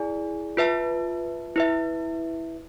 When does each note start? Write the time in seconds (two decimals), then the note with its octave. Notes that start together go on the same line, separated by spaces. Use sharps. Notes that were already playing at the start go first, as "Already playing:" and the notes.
Already playing: E4 G#4 D5 G#5
0.57 F4 B4 E5 A5
1.56 E4 B4 E5